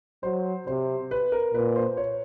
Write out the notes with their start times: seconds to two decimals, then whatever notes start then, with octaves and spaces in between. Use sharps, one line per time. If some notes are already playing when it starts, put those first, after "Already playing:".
0.23 F#3 C5
0.67 C3 C5
1.11 B4
1.32 A#4
1.54 A#2 B4
1.76 C5
1.97 C#5